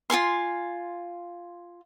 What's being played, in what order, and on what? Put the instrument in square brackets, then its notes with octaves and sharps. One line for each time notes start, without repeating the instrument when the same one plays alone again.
[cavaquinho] F4 A4 G#5 C6